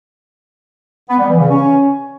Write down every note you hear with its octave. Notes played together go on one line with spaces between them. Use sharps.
B3
G3
E3
C#3
C#4